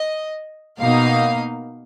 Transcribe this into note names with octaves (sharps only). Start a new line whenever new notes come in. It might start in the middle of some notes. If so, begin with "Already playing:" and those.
Already playing: D#5
B2 A#3 D#4 F5